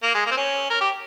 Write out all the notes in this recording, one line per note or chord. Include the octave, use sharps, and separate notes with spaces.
A#3
G#3
A#3
C4
C#4
A#4
G4